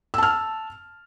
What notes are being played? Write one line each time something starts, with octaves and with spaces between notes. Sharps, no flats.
A5 E6 F6